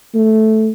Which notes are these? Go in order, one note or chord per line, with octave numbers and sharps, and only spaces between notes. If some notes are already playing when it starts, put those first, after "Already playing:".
A3